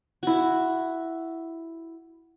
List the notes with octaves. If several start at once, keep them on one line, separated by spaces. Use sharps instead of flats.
E4 F#4